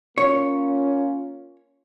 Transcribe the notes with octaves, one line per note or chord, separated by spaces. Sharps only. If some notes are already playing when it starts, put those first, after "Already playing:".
A#3 C#4 F4 C#5